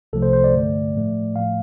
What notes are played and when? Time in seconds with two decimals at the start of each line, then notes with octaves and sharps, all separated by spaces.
0.13 C2 C3 F3 A3 A4
0.22 C5
0.33 C5
0.44 D5
0.53 G2 D3 A3
0.95 A2 F3 A3
1.36 A2 F3 A3 F5